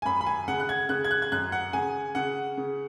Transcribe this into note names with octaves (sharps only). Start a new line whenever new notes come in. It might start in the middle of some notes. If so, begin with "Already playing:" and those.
G#5
F#2 B5
B5
G#5
C#3 F#5
F#6
G#6
C#3 F#6
G#6
F#6
G#6
F#2 F#6
F#5
C#3 G#5
C#3 F#5
C#3